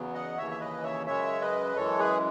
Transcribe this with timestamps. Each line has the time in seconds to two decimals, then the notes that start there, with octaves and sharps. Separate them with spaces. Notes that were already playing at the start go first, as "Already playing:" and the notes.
Already playing: E2 C#3 F#3 B3
0.14 D#5 F#5
0.37 D#2 C#3 E3 C#5 E5
0.51 E5
0.60 B4 D#5
0.83 C#5 E5
1.07 F#2 C#3 G#3 C#5 E5
1.41 B4 D#5
1.76 F#2 E3 G#3 A4 C#5
1.99 G#4 B4